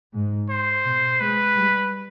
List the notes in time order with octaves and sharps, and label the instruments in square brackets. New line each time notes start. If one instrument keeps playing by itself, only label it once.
[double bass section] G#2
[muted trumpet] C5
[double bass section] B2
[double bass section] G#3 [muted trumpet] B4
[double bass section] G3